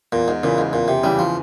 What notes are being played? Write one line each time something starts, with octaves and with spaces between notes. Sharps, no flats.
E2 A#2
G#2
A#2 C#3 E3
G#2
E2 A#2
C3
C#3 E3 G3
F3